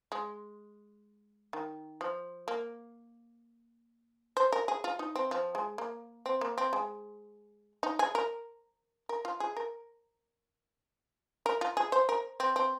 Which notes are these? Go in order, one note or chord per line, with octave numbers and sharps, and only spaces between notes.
G#3
D#3
F3
A#3
C5
A#4
G#4
F4
D#4
C4
F3
G#3
A#3
C4
A#3
C4
G#3
D#4
G#4
A#4
A#4
F4
G#4
A#4
A#4
F4
G#4
C5
A#4
C4
C4